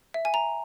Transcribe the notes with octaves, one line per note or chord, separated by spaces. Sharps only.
E5
G#5
A#5